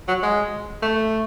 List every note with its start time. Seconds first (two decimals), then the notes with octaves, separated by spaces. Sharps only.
0.08 F#3
0.23 G#3
0.83 A3